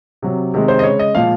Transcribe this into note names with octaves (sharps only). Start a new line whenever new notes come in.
C3 F#3
C3 D#3 G#3
C5
D#5
C#3 G#3 C#5
D#5
A#2 F3 G#3 F5